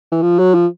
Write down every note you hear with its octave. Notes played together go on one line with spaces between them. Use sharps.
E3
F3
F#3
F3